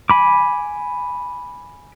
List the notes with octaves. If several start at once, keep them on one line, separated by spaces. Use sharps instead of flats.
G#5 B5 D6